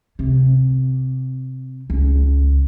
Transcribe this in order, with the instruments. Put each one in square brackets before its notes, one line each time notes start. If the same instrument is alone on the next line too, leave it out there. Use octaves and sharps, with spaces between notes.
[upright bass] C3
C#2